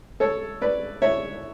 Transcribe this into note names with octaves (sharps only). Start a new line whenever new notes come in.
A4 C#5
B4 D5
C#5 E5